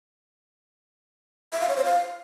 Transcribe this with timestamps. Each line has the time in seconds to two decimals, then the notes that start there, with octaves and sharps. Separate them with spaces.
1.53 E5
1.61 F5
1.69 C#5
1.77 C5
1.85 F5